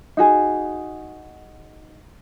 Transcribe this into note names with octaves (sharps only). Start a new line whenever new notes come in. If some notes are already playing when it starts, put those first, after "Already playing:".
D#4 F#4 G#4